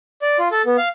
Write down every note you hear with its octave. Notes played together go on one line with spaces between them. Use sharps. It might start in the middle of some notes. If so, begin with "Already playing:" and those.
D5
F4
A4
B3
F5